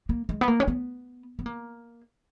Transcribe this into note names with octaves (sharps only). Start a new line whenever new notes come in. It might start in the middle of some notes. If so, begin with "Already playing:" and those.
A#3
G#3
B3
A#3
C#4
B3
B3
A#3